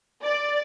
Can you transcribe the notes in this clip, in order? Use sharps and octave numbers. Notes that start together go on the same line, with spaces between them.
D5